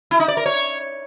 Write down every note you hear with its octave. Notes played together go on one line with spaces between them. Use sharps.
E4
D#4
D5
A#4
C#5